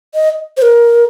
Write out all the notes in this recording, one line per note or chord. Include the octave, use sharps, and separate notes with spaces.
D#5
C5
A#4